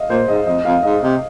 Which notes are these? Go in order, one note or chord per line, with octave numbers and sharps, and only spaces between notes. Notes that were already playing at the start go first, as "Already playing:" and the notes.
Already playing: D#5 F5
A#2 C5
G#2 D#5
F2 D#5
F2 F5
G#2 D#5
C3 D#5